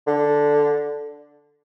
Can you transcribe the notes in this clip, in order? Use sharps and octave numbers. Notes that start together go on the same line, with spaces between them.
D3